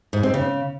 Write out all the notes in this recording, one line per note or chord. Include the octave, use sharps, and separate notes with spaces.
G#2
C4
C#3